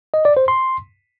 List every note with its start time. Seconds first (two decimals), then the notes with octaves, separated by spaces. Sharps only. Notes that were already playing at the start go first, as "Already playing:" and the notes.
0.14 D#5
0.25 D5
0.37 C5
0.48 C6